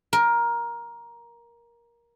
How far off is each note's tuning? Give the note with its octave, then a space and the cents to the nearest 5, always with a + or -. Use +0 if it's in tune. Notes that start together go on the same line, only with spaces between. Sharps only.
A#4 +15